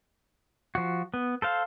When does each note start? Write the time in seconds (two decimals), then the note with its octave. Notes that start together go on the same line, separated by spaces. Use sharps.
0.75 F3 F#4
1.14 B3
1.42 A4 C5 F5